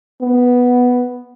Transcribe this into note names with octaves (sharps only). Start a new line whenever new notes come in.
B3